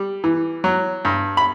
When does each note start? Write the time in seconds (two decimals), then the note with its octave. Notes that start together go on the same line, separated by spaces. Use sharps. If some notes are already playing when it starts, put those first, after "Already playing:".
Already playing: G3
0.24 E3
0.64 F#3
1.05 G2
1.37 B5